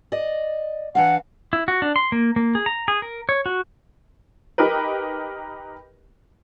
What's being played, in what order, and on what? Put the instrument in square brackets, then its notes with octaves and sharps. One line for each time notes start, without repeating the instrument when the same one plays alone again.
[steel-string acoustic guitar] D5 D#5
[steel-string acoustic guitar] E3 D4 F5 [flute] F#5
[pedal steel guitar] E4
F#4
D4
C6
A#3
A#3
G#4
A#5
G#4
A#4
C#5
F#4
[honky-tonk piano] D#4 G4 A#4 B4